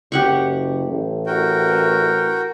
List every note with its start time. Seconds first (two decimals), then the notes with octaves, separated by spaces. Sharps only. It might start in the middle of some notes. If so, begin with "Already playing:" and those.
0.12 F#1 G4 F#5 C#6
0.87 A1
1.26 F#4 A#4 G5